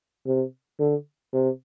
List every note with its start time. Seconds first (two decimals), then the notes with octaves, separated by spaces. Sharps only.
0.26 C3
0.79 D3
1.33 C3